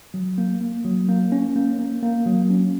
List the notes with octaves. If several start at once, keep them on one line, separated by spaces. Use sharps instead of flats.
F#3
A#3
A#3
F#3
A#3
C#4
A#3
A#3
A#3
F#3
C#4